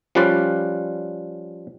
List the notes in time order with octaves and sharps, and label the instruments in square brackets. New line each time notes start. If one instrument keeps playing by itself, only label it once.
[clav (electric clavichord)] F3 G3 C#4 F4 B4 D5